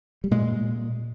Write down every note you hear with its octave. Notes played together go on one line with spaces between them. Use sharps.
G3
A#2 G#3